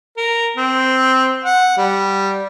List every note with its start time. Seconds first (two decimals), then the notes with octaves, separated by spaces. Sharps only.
0.17 A#4
0.57 C4
1.44 F#5
1.77 G3